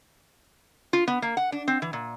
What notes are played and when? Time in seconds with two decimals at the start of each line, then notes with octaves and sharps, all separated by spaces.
0.93 F4
1.08 B3
1.22 A#3
1.37 F#5
1.52 D4
1.68 C4
1.82 E3
1.93 A#2